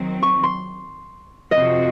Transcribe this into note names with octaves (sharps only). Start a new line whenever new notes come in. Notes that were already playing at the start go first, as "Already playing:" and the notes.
Already playing: D#3 F#3 C4
C#6
C6
F2 C3 F3 C4 F#4 D#5